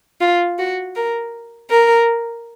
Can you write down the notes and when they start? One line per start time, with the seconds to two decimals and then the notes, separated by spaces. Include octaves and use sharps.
0.21 F4
0.58 F#4
0.96 A#4
1.70 A#4